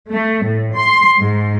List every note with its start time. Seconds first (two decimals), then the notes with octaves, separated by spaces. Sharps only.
0.11 A3
0.45 A2
0.77 C6
1.20 G#2